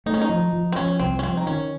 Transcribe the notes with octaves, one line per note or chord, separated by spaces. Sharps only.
A3 D#4
C#4
D#4
F3
F3
C4
F3 C#4
C2 C4
C#4
F3 C4
D#4
D#3 C#4